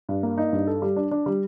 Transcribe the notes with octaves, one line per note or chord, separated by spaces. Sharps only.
G2
A#3
D#4
G2
A4
G3
D4
D4
G3